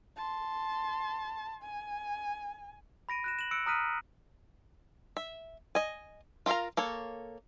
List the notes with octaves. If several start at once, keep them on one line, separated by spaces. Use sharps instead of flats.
A5 C6
G#5
B5 A#6 D7 D#7
F#6 A#6 E7
E7 F#7
E6 F#6 C#7 D7
A#5 D#6 F6 F#6 B6 D#7
E5
D#5 G#5
F4 A#4 E5 F5 A#5
A#3 A4 C#5